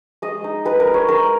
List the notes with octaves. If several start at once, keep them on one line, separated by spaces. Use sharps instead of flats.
G#3 D#5
D#4
G#3 B4
A#4
D#4
C#5
G#3 A#4